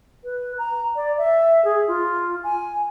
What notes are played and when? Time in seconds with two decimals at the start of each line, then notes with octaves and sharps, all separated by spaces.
0.24 B4
0.58 A#5
0.96 D5
1.18 E5
1.65 G#4
1.88 F4
2.43 G#5